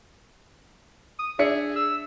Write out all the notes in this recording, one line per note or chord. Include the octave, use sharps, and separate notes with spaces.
D#6
D4 G#4 E5 C#7
E6